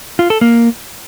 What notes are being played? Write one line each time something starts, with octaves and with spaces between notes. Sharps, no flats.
F4
A4
A#3